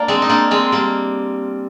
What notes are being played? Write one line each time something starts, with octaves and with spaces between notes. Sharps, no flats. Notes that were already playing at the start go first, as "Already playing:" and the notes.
Already playing: A#3 D4
G#3 C4
D#4
A#3 D4
G#3 C4
G3 A#3